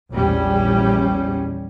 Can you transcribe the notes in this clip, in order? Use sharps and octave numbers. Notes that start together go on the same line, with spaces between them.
A#1 E2 G3 C#4